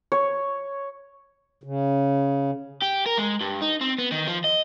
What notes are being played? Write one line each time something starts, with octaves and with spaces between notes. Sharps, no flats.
C#5
C#3
G4
A#4
G#3
G2
D#4
C4
B3
D#3
F3
D#5